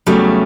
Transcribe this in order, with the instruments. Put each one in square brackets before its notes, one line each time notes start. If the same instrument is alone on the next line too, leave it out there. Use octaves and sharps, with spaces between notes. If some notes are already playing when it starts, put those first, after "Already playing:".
[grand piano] E2 C#3 G3 [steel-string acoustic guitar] F#3 A3